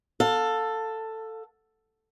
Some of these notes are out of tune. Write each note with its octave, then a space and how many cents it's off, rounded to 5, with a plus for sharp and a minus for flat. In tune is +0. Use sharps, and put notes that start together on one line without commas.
A4 +10 F5 +30